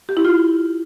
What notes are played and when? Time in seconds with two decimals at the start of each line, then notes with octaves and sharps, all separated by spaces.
0.09 G4
0.17 E4
0.25 F4